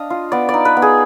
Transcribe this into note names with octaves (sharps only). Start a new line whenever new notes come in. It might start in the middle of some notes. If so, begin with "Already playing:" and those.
Already playing: D4 D#5 F5
F4
B3 D5
D5
D#4
B4
B3
G#4